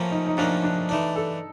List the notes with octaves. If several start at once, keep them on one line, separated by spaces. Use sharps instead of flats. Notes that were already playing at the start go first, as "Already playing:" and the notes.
Already playing: A2 F3 A#3 C#4
D#4
D#4
A2 F3 A#3 C#4 D4
D4
E3 A3 D4 D#4
A4